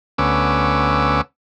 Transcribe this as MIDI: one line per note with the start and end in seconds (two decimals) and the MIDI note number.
0.18 1.21 38
0.18 1.21 59
0.18 1.21 61
0.18 1.21 86
0.18 1.21 88